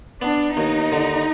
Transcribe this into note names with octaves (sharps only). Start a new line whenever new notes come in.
B3 D4
D#2 D#4
D3